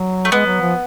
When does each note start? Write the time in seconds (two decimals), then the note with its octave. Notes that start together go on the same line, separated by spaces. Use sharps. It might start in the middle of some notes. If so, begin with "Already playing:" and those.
Already playing: F#3
0.25 A3
0.32 G#3 B3
0.46 F#3
0.61 F3